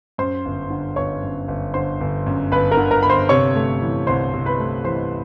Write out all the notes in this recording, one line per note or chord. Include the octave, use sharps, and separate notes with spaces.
F#2 C5 C6
G1
D3
G1 C#5 C#6
F#2
G1
D3 C5 C6
G1
F#2
G1 B4 B5
A#4 A#5
D3
A#4 A#5
G1 B5
C5 C6
C3 C#5 C#6
A3
E3
C2 C5 C6
C3
B4 B5
A3
E3 C5 C6